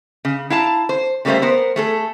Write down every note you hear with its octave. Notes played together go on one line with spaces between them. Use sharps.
C#3
E4 F5 A5 A#5
C5
C#3 G3 A3 A#3 C5 E5
B3 A#4 C5
A3 G#4 A4